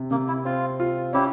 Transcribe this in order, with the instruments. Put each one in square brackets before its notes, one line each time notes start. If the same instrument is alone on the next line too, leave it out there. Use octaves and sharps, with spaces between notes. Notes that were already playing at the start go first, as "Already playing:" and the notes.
Already playing: [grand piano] C3
[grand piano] C3 [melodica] A#3
[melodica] E4
[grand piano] C4 [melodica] F4
[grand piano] F4
[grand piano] C#4 [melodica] E4 G4